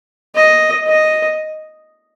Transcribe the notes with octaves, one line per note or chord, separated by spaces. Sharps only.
D#5
D#5